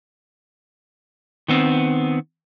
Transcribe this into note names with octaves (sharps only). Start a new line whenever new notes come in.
D#3 B3 C4